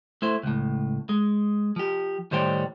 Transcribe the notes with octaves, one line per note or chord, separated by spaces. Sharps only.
A3 E4 C5
C#2 A2
G#3
F3 G4
A2 D#3 G3 C5 C#5 G5